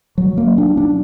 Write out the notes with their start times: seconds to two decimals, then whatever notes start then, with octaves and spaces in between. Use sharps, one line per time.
0.18 F#3
0.37 A#3
0.58 D4
0.77 D4